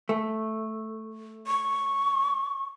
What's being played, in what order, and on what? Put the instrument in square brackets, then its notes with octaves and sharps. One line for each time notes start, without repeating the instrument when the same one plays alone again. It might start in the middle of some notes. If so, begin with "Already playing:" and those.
[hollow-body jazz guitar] A3
[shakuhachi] C#6